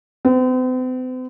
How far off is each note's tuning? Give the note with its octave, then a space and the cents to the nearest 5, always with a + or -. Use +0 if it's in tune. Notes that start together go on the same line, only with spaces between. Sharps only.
C4 -45